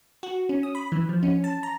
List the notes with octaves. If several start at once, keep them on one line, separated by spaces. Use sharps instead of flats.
F#4
C#4
D#6
B5
E3
F3
C#4
A5
A#5